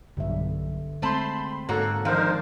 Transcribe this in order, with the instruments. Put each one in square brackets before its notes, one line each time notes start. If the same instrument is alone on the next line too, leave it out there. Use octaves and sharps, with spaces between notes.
[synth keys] B1 G2 [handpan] D3 E5
[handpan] G#3 C4 [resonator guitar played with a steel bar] A3 C5 A5 [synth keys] B5 C6
[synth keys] G#2 A4 [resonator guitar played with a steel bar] A#3 F#4 C#5
[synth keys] D#3 F3 [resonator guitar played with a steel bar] G#3 D4 [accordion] D#4 A#4 C5 [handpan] F5